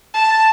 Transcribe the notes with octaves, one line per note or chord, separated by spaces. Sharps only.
A5